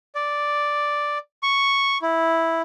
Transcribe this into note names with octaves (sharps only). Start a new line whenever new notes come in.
D5
C#6
E4